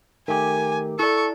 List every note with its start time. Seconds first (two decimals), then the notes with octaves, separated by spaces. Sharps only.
0.28 D#3 A3 G4 A#4 G#5 D6
0.99 E4 A4 D5 C#6